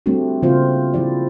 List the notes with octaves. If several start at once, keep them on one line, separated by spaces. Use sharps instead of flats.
G3 A3 C4 D4 F#4
C#3 F3 A#3 C4 F4 C5
F3 E4 D5